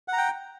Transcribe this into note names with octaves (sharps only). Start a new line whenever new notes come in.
F#5 G5 A#5